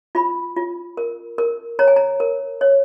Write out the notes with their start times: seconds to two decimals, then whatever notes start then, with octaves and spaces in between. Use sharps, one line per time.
0.15 F4 B5
0.56 F4
0.97 A#4
1.38 A#4
1.79 C#5 A#5
1.88 G#5
1.96 A#5
2.20 A#4
2.61 C#5